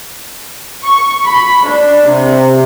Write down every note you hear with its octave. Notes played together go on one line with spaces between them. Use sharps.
C#6
B5
D4
C3